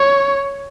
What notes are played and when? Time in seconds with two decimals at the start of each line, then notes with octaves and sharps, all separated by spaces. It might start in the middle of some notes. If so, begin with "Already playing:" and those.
Already playing: C#5